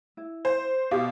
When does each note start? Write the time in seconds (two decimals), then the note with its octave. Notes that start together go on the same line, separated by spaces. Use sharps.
0.17 E4
0.45 C5
0.91 B2 G4 A#4 F5